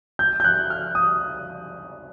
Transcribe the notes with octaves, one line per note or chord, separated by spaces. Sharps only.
G6
G6
F#6
F6
D#6